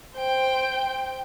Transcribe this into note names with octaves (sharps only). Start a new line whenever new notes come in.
C5 G5